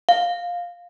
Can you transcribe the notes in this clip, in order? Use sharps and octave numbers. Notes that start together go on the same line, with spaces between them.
F5